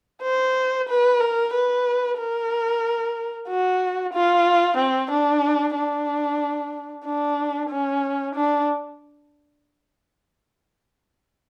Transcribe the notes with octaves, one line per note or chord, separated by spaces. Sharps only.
C5
B4
A#4
B4
A#4
F#4
F4
C4
D4
D4
D4
C#4
D4